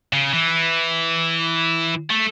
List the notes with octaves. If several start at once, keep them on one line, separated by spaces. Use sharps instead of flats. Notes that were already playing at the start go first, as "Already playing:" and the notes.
C#3
E3
A3